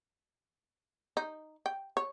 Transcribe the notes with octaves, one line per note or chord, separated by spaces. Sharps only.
D#4
G5
C#5